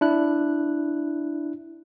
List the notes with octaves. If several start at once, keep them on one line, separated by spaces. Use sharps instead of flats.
D4 E4 F#6